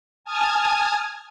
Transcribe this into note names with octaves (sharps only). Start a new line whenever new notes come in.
G#5 A5 D#6 F6 G#6